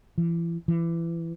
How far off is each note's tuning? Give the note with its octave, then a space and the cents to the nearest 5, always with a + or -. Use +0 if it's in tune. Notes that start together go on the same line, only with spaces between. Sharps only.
E3 +35
E3 +25